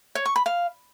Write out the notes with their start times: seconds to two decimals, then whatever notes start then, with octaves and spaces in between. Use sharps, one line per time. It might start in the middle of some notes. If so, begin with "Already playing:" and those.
0.15 C#5
0.26 C#6
0.36 B5
0.46 F5